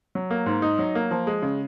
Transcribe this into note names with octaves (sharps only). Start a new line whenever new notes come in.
F#3
A#3
G#2
D#4
F#3
A#3
F3
G#3
C#3